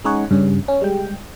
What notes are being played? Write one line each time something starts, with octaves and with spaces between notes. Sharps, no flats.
G#3 C#4 D#4 G#4 C#5 F#5
G2 C#3 G3 C#4
C#4
G3 G#3 G5